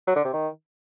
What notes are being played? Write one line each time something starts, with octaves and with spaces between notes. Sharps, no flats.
F#3
D3
C3
D#3